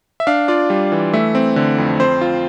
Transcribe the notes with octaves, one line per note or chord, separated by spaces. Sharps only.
E5
D4 F5
F4 D5
G3
E3
A3 E5
C4
D3
F2
C4 C5
F4